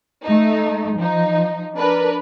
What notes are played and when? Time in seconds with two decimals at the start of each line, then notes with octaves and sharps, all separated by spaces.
0.23 A3 D#4
0.96 F3 D#4
1.77 D4 A#4 B4